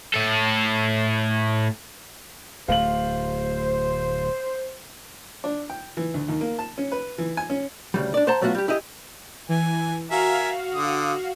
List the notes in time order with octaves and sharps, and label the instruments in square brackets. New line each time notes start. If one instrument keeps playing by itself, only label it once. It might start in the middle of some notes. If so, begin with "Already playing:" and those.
[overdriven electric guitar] A2 A4
[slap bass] D1 A3 [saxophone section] C5 [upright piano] F5 F#7
[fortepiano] D4
G5
E3
D2
D#2
A#3
A5
C#4
B4
E3
G#5
C#4
[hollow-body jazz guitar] D2 C#3 G3
D4 D5
C5 F#5 A5 A#5 C6
F#3 A3 B3 F4 F#4
G3 G4
E4 G4 G#4 D#5
[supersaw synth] E3 [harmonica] G#5
[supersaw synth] F#4 F5 [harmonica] A#4 E5 G#5
[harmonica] D3 D#6